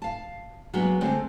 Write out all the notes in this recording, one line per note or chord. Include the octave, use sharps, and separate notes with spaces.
F5 A5
F#3 G#3 A#3 B3 D4
D3 G#3 A3 C4 D4 C5